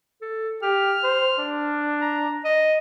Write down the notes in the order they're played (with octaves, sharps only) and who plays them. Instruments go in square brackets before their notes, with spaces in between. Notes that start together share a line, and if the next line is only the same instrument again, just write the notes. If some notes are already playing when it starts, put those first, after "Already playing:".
[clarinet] A4
[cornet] G4 [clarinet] F6
[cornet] C5
D4
[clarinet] A#5
D#5